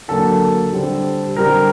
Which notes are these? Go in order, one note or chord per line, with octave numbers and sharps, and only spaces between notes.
D3 F#3 A#3 A4
D3 G3 C4
D3 G3 C4 A#4